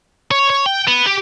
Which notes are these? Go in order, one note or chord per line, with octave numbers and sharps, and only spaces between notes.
C#5
C#5
G5
B3
G4